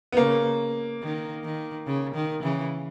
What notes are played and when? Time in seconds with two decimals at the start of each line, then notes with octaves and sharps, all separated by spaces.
0.12 B3
0.17 C#3 A#3
1.02 D#3
1.44 D#3
1.87 C#3
2.15 D#3
2.43 C#3 E3